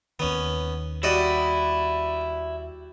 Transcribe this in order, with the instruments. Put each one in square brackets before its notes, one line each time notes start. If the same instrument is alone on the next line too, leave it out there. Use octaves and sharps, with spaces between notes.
[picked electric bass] D#2 D#3 [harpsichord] B3 C#4
[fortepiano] G3 F#4 [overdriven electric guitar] E4 [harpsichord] D5 D#5 F#5